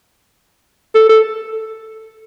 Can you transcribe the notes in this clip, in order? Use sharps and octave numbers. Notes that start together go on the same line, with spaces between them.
A4
A4